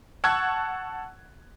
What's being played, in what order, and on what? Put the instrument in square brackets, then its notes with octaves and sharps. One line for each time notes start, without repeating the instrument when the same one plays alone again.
[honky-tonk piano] F#5 A5 C#6 E6 F#6 G#6